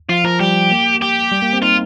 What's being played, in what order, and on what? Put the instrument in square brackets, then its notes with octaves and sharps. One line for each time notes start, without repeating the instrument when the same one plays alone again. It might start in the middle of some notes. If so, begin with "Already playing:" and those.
[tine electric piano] F3 [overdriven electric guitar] F4
[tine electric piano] F3 [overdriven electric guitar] A#4
[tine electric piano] G3 [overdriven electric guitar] G4
[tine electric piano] A#3
[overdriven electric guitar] G4
[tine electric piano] G3
A#3
C4
[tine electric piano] D#4 [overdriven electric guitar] F4